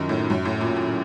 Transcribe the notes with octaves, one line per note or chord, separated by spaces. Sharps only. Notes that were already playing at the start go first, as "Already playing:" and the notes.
Already playing: F#2 D#3 F3
A2
F#2
A2
A#2
A#2